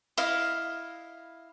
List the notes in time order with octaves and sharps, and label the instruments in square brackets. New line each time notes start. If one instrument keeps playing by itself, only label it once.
[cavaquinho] E4 D#5 F5